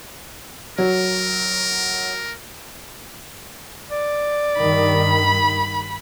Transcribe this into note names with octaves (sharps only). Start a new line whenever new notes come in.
F#3 A#4
D5
G2 D#3 B5